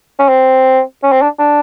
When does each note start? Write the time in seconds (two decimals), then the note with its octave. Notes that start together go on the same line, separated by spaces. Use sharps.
0.19 C#4
0.29 C4
1.03 C#4
1.12 C4
1.22 D4
1.39 D4